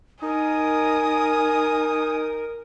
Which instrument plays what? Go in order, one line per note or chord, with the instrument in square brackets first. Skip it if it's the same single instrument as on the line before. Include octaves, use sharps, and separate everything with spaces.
[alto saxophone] D#4 [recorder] A#4 [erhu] G#5 [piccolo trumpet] D#6